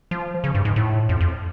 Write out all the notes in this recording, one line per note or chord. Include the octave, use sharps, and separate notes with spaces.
F3
C#3
G2
G#2
A2
F2
F2